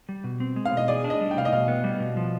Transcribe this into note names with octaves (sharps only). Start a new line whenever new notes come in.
G3
B2
C4
G#3
F5
B2 D#5
G#4 D5
D4
D#5
G3
G5
C3 F5
D#5
B2 F5
B3
G3
B2
F3